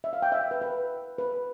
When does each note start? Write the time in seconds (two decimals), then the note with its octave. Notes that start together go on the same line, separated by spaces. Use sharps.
0.04 E5
0.13 F5
0.22 G5
0.32 E5
0.51 B4
0.61 B4
1.18 B4